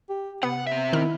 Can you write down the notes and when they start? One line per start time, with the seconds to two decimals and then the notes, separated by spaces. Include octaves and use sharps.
0.10 G4
0.43 C3 B3 F#5
0.67 C4 E5
0.93 D#3 E4 F6